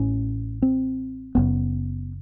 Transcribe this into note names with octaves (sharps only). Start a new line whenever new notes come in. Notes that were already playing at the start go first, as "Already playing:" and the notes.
Already playing: A1 A2 C#4
C4
F#1 F#2 C#3 B3